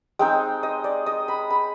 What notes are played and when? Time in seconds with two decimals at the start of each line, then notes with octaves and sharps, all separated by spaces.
0.19 G#3 C4 D#4 G5
0.63 D#5
0.84 D5
1.06 D#5
1.28 B5
1.50 B5